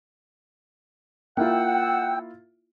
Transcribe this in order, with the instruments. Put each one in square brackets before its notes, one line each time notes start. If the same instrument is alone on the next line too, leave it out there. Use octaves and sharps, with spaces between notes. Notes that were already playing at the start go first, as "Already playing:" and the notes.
[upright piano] A#3 E4 F4 [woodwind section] F#5 E6 [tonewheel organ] G5